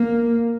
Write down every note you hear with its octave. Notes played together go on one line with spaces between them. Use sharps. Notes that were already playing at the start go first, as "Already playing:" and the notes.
Already playing: A#3